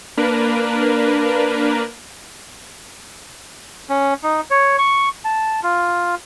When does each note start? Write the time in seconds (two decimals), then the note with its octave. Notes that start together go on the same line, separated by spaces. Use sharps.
0.17 A#3 D4 A#4 B4
3.89 C#4
4.23 D#4
4.50 C#5
4.78 C#6
5.25 A5
5.63 F4